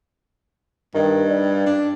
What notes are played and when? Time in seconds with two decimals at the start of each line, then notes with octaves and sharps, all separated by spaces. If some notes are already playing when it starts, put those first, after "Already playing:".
0.94 G2 D#3
1.29 G3
1.66 D4